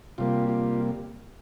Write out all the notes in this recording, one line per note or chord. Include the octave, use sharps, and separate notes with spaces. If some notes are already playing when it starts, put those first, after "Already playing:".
C3 G3 A#3 F4
F4